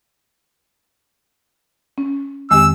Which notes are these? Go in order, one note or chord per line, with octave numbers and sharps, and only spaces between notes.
C#4
F2 D#3 G#3 C4 G4 G#5 E6